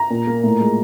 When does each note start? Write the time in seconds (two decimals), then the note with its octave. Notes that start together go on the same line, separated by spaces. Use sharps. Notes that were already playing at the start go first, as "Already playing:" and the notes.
Already playing: A#5
0.10 A#2
0.27 A#3
0.44 A2
0.60 G#3